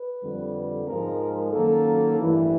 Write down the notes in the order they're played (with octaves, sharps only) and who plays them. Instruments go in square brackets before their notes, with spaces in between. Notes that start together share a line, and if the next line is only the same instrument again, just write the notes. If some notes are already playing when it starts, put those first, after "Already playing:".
Already playing: [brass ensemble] B4
F2 D3 G3
G#2 F3 G#3 A#4
F#2 D#3 F#3 A#3 A4
A1 G2 E3